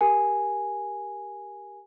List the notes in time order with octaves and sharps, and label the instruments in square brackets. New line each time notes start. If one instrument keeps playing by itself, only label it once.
[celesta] G4 A#4 G#5